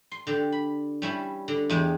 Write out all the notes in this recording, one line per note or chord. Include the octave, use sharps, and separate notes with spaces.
C6
D3 G4
B5
G3 C#4 E4
D3
E2 G#3 G4